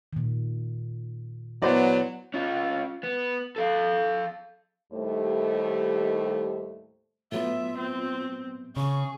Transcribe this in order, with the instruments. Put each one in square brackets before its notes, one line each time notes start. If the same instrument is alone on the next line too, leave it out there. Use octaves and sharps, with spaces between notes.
[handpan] A#2 D#3
[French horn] F#3 [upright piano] B3 C5 D5 [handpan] E4
[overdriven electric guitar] C#4 F4
B3
A4 F5
[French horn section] D#2 A2 D#3 G3 A3 C5
[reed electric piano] A2 F#3 B3 [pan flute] F4 [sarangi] E5
[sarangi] C4
[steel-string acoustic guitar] C#3 [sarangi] G#4 [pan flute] C#6